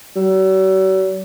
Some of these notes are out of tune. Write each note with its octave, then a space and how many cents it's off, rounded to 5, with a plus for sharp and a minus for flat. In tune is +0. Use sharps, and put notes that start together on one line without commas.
F#3 +45